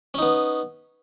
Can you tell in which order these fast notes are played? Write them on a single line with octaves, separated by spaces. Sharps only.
C#4 D#4 B3